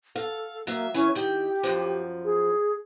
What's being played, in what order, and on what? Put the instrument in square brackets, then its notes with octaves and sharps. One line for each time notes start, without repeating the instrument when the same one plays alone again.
[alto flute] A4 [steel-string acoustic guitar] F5
[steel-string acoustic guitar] F#3 E5 [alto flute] A#3
[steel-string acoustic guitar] E3 G#5 [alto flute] C#4
[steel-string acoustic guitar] D#3 G5 [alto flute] G4
[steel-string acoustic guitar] F#2 B2 F3
[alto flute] G#4